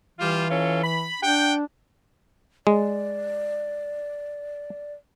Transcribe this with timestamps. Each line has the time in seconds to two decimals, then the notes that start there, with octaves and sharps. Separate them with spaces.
0.19 E3 G3 F4
0.50 C#4 F4 A4
0.83 B5
1.22 D4 F#5 G5
2.67 G#3 D5